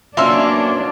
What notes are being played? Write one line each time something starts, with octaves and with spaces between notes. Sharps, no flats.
F#3 A#3 B3 C#4 D4 E5 C6 E6